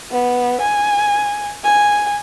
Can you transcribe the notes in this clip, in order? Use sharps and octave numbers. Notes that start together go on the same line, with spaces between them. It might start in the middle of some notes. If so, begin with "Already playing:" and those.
B3
G#5
G#5